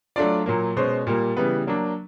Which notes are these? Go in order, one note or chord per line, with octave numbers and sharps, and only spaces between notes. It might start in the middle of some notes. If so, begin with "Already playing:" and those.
F#3 A3 D4 F4 D5
A#2 F#3 A#3
B2 G#3 C#4 C5
A#2 G3 A#3
C#3 E3 G3 B3 B4
F#3 A#3 D4